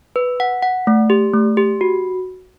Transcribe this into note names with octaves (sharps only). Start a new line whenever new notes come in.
B4
F#5
F#5
A3
G4
A3
G4
F#4